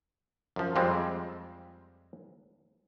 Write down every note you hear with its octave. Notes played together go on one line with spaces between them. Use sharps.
F#2 F3
F2 G3 G#3 C4